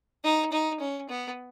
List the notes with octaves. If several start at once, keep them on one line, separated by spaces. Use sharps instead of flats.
D#4
D#4
C#4
B3